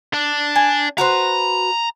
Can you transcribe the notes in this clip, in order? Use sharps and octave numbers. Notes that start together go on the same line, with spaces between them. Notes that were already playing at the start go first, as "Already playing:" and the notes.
D4
G#5
F#4 B4 C5 A#5